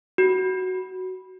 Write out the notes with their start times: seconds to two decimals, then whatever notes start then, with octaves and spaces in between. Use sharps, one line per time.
0.18 F#4